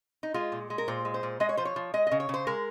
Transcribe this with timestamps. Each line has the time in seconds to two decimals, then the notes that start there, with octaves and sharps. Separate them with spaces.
0.23 D#4
0.34 G#3 F4
0.52 A#2
0.70 G#3
0.78 A#4
0.88 A#2 C5
1.05 G#3
1.14 C5
1.23 A#2
1.40 G#3 D#5
1.49 C#5
1.57 F3 C5
1.65 C#5
1.76 F3
1.94 G#3 D#5
2.07 C#3 D#5
2.20 C#5
2.29 C#3 C5
2.47 G#3 A#4